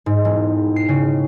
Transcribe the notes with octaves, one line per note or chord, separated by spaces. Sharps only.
G#2
E1
C7
C#3